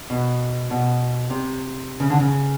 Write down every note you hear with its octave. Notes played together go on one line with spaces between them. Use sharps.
B2
B2
C3
C#3
D3
C#3